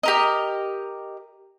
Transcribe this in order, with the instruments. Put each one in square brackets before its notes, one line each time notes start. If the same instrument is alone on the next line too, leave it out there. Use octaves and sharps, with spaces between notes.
[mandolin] G4 A#4 D#5